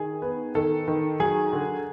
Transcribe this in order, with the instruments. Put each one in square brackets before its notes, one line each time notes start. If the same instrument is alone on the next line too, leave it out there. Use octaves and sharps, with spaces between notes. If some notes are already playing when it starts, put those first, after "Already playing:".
Already playing: [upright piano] D#3 G#4
B3
D#3 A4
D#3
F#3 G#4
D3